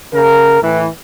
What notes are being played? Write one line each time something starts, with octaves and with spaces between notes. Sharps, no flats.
C#3 A#4
A2 E3